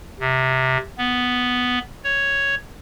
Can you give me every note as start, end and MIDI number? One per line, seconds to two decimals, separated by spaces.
0.20 0.77 48
0.98 1.79 59
2.04 2.55 73